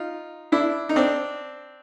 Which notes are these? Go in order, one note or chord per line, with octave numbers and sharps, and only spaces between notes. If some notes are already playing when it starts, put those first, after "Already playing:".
Already playing: D#4 F4
D4 E4
D#4
C4 D4